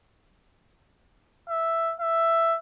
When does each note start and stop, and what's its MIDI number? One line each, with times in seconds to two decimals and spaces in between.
1.49 1.94 76
2.00 2.58 76